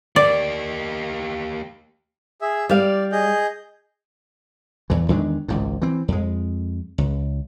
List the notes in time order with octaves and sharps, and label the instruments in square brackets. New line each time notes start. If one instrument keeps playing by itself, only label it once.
[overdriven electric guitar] A#3 G4 [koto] D5
[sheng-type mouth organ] G#4 E5
[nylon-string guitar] G3 F5 [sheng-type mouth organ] D5
[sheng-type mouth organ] G#4 D#5 G6
[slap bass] E2 E3
E2 D#3 G#3 D4
G#1 C#2 G#2
E3 C4
F2 G#3
C#2